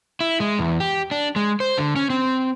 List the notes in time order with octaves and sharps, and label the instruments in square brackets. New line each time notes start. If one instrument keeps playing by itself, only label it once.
[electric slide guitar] E4
G#3
E2
G4
D4
G#3
C5
D3
C#4
C4